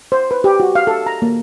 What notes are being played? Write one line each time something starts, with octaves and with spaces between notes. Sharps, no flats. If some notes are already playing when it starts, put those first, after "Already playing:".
C5
B4
G4
F#4
F5
A4
A#5
A#3